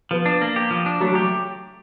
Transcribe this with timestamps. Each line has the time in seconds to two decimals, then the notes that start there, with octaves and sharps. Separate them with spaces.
0.11 F3 B3
0.26 D4
0.41 A#3
0.56 G4
0.71 F3
0.86 D4
1.00 F#3 A3
1.13 F#3
1.15 G4